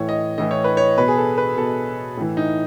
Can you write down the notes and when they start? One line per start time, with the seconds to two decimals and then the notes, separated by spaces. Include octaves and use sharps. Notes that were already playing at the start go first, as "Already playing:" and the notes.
Already playing: A2 E3 C#5
0.09 D#5
0.38 A2 E3 D#5
0.51 C#5
0.64 B4
0.77 C#5
0.98 B2 B4
1.08 G#4
1.17 A4
1.38 B4
1.57 B2 A4
2.17 A2 E3
2.37 D#4